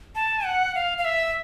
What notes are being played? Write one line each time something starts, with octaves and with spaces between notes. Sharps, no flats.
A5
F#5
F5
F5
E5